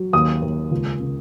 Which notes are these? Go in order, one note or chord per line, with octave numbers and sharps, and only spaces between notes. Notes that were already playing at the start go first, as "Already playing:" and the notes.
Already playing: F#3
D#2 D#6
D#2
C#2
C#3